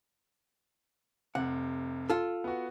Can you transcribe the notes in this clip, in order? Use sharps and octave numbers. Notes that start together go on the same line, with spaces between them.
F1 C3 F#5
F4 A4
B3 F#4